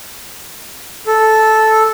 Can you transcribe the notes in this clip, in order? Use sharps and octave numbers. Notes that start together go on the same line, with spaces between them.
A4